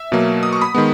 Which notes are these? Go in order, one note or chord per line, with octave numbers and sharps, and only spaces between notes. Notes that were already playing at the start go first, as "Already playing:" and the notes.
Already playing: E5
B2 F#3 A#3
D#6
C#6
B5 D#6
D#3 G#3 B3